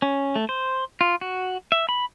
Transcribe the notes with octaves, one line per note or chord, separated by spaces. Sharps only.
C#4
A3
C5
F4
F#4
E5
B5